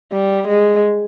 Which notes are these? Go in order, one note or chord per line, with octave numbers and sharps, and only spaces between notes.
G3
G#3